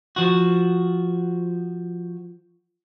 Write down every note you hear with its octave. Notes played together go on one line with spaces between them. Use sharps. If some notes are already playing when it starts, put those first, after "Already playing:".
F3 F#4